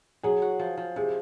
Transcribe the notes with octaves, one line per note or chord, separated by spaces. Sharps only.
F#3 G#4
F#4
F3
F3
C3 G#4